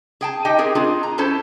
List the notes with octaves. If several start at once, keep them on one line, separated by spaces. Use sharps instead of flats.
G#4 G5 A5
D#4 G4 D#5 G5
C4 G#4 A#4
D4 F4 G#4
A#5
C#4 E4 A4 C5 A5